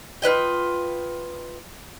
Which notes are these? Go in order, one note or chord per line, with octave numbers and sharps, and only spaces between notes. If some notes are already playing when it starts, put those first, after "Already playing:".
F4 B4 D#5 G5